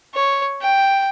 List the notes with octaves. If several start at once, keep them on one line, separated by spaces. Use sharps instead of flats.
C#5
G5